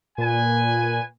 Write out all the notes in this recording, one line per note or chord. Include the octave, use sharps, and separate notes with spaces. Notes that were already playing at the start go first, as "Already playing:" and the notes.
A#2 B4 G#5